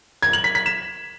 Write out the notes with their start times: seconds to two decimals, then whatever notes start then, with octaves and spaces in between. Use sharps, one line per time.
0.23 G#6
0.33 F#7
0.44 B6
0.55 B6
0.66 E7